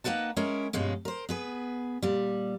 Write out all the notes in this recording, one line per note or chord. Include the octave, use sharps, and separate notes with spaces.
A#3 D#4 B4 F#5 A5
G#3 C#4 E4 A#4
G2 B2 F3 G#3 C#4
A#4 C5
B3 G#4 B4
A#2 G3